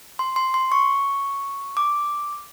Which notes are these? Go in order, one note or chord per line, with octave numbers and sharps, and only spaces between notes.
C6
C6
C6
C#6
D6